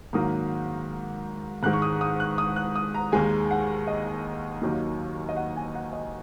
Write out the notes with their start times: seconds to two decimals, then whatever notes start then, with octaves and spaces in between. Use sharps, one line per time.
0.13 G#2 D#3 F#3 A#3 D#6
1.63 G#2 D#3 G#3 F#6
1.73 C#6
1.82 D#6
2.01 D#6
2.20 F#6
2.38 D#6
2.56 F#6
2.76 D#6
2.94 A#5
3.12 D#2 D#3 G#3 G#5
3.51 F#5
3.87 D#5
4.62 D#2 D#3 F#3 A#3
5.29 D#5
5.36 F#5
5.56 G#5
5.75 F#5
5.93 D#5